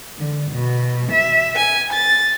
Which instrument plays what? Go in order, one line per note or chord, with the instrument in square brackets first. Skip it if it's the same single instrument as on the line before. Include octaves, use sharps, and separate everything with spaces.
[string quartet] D3
B2
E5
G#5
A6